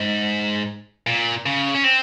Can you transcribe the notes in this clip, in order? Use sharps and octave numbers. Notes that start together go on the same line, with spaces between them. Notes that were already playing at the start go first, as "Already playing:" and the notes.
Already playing: G#2
A#2
C#3
C#4
C4